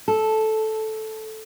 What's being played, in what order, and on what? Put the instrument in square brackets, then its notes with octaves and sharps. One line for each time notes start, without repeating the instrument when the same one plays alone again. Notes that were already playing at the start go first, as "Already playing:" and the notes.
[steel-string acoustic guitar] A4